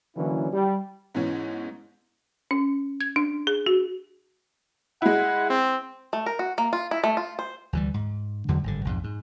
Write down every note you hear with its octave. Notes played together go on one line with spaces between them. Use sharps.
D3 E3 F#3 A#3 C#4 E4
G3
G#2 B2 E3 C#4
C#4
G#6
D4
G#4
F#4
G#3 E4 F#5
C4
A3
A#4
F#4
A#3
F4
E4
A3
F4
C5
D2 E3 G3
G#2
E2 D3 F#3 G#3
G#1 G2 D3
B1 F2 G#2
G#2